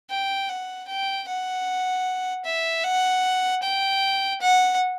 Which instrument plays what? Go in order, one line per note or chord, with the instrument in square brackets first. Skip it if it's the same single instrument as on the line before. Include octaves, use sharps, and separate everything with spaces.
[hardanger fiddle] G5
F#5
G5
F#5
E5
F#5
G5
F#5